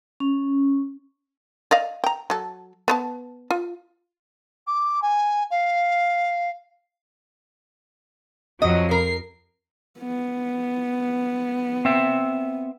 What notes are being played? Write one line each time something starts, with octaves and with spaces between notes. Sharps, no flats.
C#4
D5 D#5 F5
G5 A#5
F#3 A4
B3 C5 A5
F4
D6
G#5
F5
F2 F3 F#3 D#5
A#4 C7
B3
C4 E5